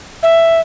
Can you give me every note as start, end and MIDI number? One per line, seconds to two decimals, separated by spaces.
0.23 0.61 76